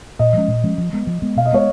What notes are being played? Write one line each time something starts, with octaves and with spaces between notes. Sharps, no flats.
A#2 D#5
F3 G#3 C#4
A#2
F3 G#3 C#4
F3
G#3 B3
F3
G#3 B3
B2 F5
D#5
G#3 B3 C#5